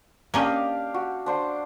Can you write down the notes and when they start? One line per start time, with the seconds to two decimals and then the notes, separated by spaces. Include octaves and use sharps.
0.34 A#3 C#4 D4 G4 D#5 F5
0.94 F#4
1.26 D4 C5 F#5